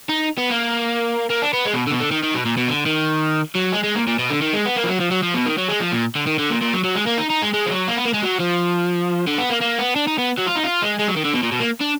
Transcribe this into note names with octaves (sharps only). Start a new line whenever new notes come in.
D#4
B3
A#3
A#3
D4
B3
G#3
B2
D3
B2
D3
D#3
D#3
B2
A#2
B2
D3
D#3
F#3
G#3
G#3
A#2
A#2
B2
D3
D#3
G#3
B3
A#3
F3
F#3
F3
F#3
F3
B2
D#3
F#3
G#3
F3
A#2
D3
D#3
D3
A#2
A#2
F#3
F#3
G#3
A#3
D#4
D#4
G#3
G#3
F3
F#3
A#3
B3
A#3
G#3
F#3
F3
D3
B3
A#3
A#3
B3
D4
D#4
B3
F#3
F4
D#4
F4
G#3
G#3
F#3
D#3
D3
B2
A#2
B2
A#3
D4